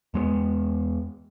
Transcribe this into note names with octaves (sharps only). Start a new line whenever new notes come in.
E2 G#3 A3 B3